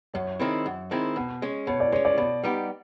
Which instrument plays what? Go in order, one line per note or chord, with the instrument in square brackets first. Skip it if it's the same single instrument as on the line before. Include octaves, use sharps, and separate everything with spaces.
[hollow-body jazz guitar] F#2 [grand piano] C#5
[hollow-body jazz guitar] D#3 G#3 C4 E4
F#2
D#3 G#3 C4 E4
B2
G#3 C#4
[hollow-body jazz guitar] B2 [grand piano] C#5
[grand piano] D5
[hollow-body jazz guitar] G#3 [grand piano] C#5
[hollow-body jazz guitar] C#4
[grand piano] D5
[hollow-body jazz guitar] B2
G3 B3 D#4 G4